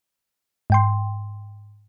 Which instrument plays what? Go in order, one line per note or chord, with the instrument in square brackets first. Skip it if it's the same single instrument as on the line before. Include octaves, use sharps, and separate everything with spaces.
[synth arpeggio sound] G#2 G5 C6